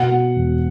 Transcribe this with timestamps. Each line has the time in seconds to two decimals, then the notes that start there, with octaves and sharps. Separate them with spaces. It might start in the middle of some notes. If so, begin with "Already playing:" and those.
Already playing: B2 F#5
0.11 B2
0.36 E1